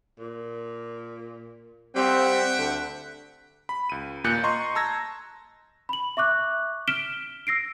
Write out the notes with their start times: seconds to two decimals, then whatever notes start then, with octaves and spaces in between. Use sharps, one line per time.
0.19 A#2
1.95 G3 C4 E5 F#5 G5
2.58 D2 A3
3.69 B5
3.90 C#2 D#7
4.24 D#2 A#2 F#6 G6 C#7
4.43 D#5 A#5 C6 C#6
4.75 A5 A#5 E6 G#6 A#6
5.89 B5 F#7
6.17 E5 C#6 D6 F#6
6.88 F6 B6 D7 E7 G7
7.47 E6 A#6 C7 D7